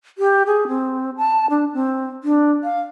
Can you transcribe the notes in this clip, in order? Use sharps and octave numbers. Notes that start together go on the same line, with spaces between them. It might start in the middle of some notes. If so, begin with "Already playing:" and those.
G4
G#4
C4
A5
D4
C4
D4
F5